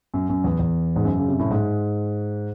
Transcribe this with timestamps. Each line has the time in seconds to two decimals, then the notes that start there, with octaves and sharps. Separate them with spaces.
0.14 F#2
0.29 F#2
0.44 E2
0.59 E2
0.96 G#2
1.05 F#2
1.18 C#3
1.28 C3
1.39 A2
1.51 G#2